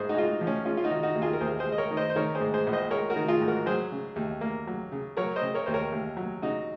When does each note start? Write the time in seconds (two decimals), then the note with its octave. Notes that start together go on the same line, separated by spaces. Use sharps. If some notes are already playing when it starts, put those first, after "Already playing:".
Already playing: G#2 G#4 C5
0.09 D#4 F#4
0.15 G#3 F4
0.28 D#4
0.41 F3
0.47 C#4
0.65 G#3 C#4 F4
0.77 F4
0.84 D#4 F#4
0.91 D#3
1.03 D#4 F#4
1.15 D#2
1.22 F4 G#4
1.33 A#4
1.40 D#2 G#4 C5
1.59 G#4 C5
1.66 G#3
1.72 D#5
1.78 A#4 C#5
1.91 D#3
1.97 C5 D#5
2.10 C5
2.16 D#3 A#4 C#5
2.35 G#4 C5
2.41 G#2
2.54 G#4 C5
2.67 A#1
2.73 C5 D#5
2.91 G#3 A#4 C#5
3.10 F#4 A#4
3.16 D#3
3.28 F4 G#4
3.41 G#2
3.48 F#4 A#4
3.66 F#3 G#4 C5
3.92 C#3
4.16 D#2
4.41 A#3
4.67 F#3
4.92 C#3
5.17 F#3 A#4 C#5
5.36 C5 D#5
5.42 C#3
5.54 A#4 C#5
5.66 D#2 C5
5.74 A#4 C#5
5.92 D#2
6.17 F#3
6.42 C#3 D#4 F#4